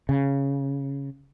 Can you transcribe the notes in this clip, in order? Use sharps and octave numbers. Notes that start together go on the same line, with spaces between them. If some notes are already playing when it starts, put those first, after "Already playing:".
C#3